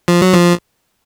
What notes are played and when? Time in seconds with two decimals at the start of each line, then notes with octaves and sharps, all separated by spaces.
0.08 F3
0.22 F#3
0.34 F3